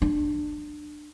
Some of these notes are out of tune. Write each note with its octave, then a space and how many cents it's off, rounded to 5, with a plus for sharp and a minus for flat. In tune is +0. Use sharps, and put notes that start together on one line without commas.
D4 +20